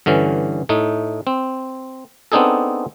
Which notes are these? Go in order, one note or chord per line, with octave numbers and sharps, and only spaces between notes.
G2 D3 E3 C#4
A2 A3 D#4
C4
B3 C4 D4 D#4 G#4 A4